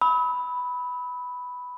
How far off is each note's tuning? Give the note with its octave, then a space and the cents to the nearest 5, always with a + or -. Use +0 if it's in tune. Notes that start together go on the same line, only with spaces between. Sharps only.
B5 +0 E6 -45